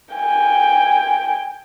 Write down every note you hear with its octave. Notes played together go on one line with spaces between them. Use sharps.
G5 G#5